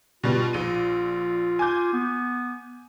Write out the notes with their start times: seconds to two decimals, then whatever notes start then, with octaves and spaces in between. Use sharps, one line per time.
0.23 B2 G3 F4
0.53 A#1 D#7
1.59 G#5 D6 G6
1.93 B3